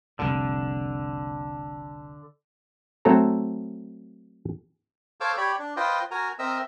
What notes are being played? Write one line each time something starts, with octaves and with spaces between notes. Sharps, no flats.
F1 C2 A#2 D3
F#3 A3 C4 A4 A#5
A4 C5 C#5 F5 D6 E6
G4 C#5 D5 B5
D4
F4 B4 C5 D#5 G5
F#4 A#4 G#5 A#5
C4 A#4 D#5 E5 E6